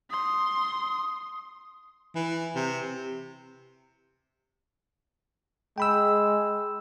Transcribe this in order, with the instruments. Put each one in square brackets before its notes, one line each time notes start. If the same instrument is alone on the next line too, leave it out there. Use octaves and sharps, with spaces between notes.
[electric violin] C6 [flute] D#6
[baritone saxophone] E3
C3
[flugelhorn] G#3 [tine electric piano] G5 B5 E6